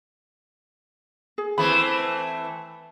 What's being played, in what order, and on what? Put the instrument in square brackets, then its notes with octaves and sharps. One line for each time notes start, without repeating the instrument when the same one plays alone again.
[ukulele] G#4
[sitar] E3 A3 C4 [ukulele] E4 B5